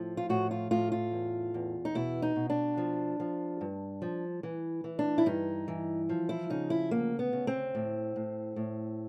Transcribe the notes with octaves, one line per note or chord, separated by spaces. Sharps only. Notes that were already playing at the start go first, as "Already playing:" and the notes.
Already playing: A2 F3
F4
A2 F#4
F4
A2 F4
F4
E2
E2
D#4
B2 E4
D#4
B2
D4
F3
F3
G2
F3
E3
E3
D4
E4
G2 D#4
E3
F3
E4
C#3 D#4
E4
D2 A#3
B3
C#3
C4
A2
A2
A2